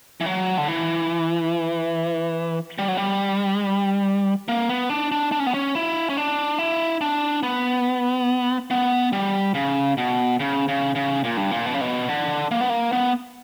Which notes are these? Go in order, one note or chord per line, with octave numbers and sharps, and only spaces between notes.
E3
F#3
D3
E3
G3
F#3
G3
A#3
B3
D4
D4
D4
C#4
B3
C#4
E4
C#4
D4
E4
D4
B3
B3
G3
C#3
B2
C#3
C#3
C#3
A#2
G2
A#2
B2
C#3
B2
D3
A#3
B3
A#3
B3